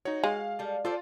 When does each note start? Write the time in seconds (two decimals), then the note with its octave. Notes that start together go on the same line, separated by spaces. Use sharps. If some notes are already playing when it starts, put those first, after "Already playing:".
0.05 D#4 F#4 C#5
0.24 G#3 F5
0.59 G3 A4
0.85 F4 A4 C5 D5